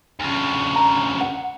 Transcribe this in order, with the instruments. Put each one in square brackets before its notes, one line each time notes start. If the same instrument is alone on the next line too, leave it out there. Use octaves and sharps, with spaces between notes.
[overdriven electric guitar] D2 C#3
[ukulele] A#5
F#5